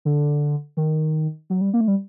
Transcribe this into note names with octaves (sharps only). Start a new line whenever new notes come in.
D3
D#3
F#3
G3
A#3
A3
G3